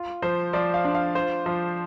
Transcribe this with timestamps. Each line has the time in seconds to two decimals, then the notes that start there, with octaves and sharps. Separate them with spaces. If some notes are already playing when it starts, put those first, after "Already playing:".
Already playing: F4
0.22 F3 C5
0.53 F3 D5
0.74 F5
0.85 D4
0.95 F5
1.15 F4 C5
1.46 F3